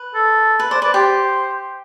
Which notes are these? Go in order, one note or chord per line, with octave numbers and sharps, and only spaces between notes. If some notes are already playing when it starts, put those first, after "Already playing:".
Already playing: B4
A4
B4
C5 D5
B4 D5
G4 C5